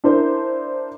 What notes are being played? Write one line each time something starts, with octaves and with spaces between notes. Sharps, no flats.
D4 E4 A#4 C5